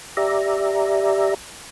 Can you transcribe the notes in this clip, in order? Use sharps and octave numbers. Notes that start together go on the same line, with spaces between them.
G4 D5 E5 A#5